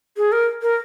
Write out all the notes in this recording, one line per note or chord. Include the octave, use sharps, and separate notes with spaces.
G#4
A#4
A#4